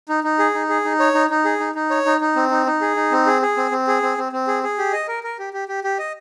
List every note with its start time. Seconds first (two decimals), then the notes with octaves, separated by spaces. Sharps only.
0.09 D#4
0.24 D#4
0.39 G#4
0.54 D#4
0.69 G#4
0.85 D#4
1.00 C#5
1.14 D#4
1.30 D#4
1.45 G#4
1.60 D#4
1.75 D#4
1.90 C#5
2.06 D#4
2.21 D#4
2.36 C4
2.51 D#4
2.66 D#4
2.81 G#4
2.96 D#4
3.11 C4
3.26 G#4
3.42 G#4
3.57 C4
3.71 C4
3.87 G#4
4.02 C4
4.18 C4
4.32 C4
4.47 G#4
4.63 G#4
4.78 G4
4.93 D#5
5.08 A#4
5.23 A#4
5.39 G4
5.53 G4
5.68 G4
5.84 G4
5.99 D#5